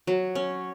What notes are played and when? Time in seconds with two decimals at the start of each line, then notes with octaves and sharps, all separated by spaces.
0.07 F#3
0.35 C#4